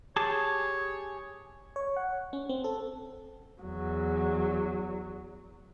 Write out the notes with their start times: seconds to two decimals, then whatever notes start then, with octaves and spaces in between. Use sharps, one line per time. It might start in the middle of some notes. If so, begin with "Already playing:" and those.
0.16 G4 G#4 C#5 A5
1.76 C#5
1.96 F#5
2.33 C#4
2.49 C4
2.64 A4
3.62 E2 F#3